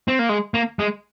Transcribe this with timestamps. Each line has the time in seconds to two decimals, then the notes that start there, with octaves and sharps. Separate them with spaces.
0.08 C4
0.19 A#3
0.29 G#3
0.54 A#3
0.79 G#3